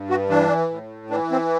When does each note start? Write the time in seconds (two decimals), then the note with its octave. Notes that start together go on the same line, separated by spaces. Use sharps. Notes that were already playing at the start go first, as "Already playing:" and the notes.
Already playing: G2
0.10 F#4
0.29 E3 D4
0.71 A2
1.10 E3 D4
1.31 C4